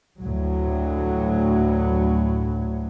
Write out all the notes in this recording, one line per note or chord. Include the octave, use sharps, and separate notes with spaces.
D2 A2 F#3